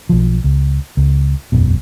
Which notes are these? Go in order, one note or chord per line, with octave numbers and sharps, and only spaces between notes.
B1 F3
C#2
C#2
E1 B1 F#2 B2